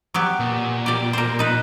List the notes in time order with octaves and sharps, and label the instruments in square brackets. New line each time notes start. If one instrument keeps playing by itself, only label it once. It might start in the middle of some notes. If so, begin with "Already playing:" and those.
[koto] F#3 B3 G4
[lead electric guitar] A#2
[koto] G4 D5
A#4 C5
D#4 B4